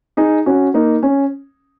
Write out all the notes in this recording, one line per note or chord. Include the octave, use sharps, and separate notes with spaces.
D#4 G#4
C#4 F#4
A#3 D#4
C#4